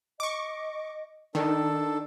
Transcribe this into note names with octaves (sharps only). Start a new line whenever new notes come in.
D#5 C#6 D6
D#3 D4 D#4 A4